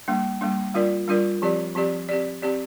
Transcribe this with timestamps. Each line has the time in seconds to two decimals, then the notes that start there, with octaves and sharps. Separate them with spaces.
0.08 G3 A#3 D4
0.41 G3 A#3 D4
0.74 G3 D4 F4 A#4 D5
1.08 G3 D4 F4 A#4 D5
1.42 F3 C4 G4 D5
1.75 F3 C4 G4 D5
2.09 C4 G4 D5
2.42 C4 G4 D5